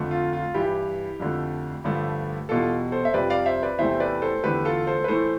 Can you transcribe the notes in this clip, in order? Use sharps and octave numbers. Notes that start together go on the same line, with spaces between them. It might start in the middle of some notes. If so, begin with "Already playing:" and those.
Already playing: F2 D3 A3
F4
F4
G2 E3 G3 E4 G4
F2 D3 A3
G2 D3 F3 A3
E2 B2 G3 F4 A4
A4 C5
E5
F2 C3 G3 B4 D5
D5 F5
C5 E5
B4 D5
E2 C3 E3 A3 C5 E5
B4 D5
A4 C5
E2 D3 A3 G4 B4
F4 A4
A4 C5
B4
A2 E3 A3 A4 C5